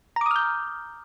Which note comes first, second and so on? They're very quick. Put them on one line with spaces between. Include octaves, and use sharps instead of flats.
A#5 D6 D#6 F6 G6